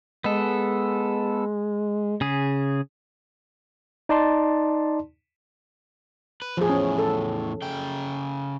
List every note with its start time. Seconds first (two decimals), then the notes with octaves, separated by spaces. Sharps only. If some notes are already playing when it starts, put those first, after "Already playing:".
0.24 G#3 B3 A4
2.21 C#3 G#4
4.09 D#4 D5 A5 C6
6.42 B4
6.57 E2 A2 F3 G#4
6.70 C#4
6.98 A4
7.62 C#3 G5